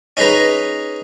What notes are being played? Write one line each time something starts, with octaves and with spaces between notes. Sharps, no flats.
C#4 D#4 G#4 B4 A#5